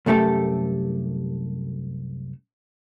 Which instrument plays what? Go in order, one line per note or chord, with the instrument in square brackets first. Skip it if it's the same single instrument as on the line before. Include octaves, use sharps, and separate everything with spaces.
[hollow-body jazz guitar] C2 F#2 A3 G4 A4